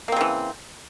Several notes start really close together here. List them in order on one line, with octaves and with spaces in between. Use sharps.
A#3 C4 C#3 E3